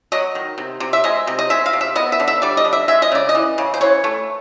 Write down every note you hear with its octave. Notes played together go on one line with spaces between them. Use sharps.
F#3 D#5
D#3
C3
C3
E5
G#3 D#5
C3
D#5
G#3 E5
F5
C3
E5
B3 D#5
E5
D3
E5
G3 D5
D#5
D3
E5
G#3 E5
D#5
C#3 D5
D#5
E3
C#3
C5
E3 C#5
A3